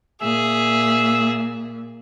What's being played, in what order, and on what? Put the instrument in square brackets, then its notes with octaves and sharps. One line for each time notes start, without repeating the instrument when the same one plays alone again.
[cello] A#2 [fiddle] G#4 [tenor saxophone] E5